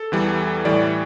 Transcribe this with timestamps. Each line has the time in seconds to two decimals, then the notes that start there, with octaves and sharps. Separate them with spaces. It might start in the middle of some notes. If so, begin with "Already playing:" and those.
Already playing: A4
0.12 E2 E3 G3
0.65 A2 E3 G3 D5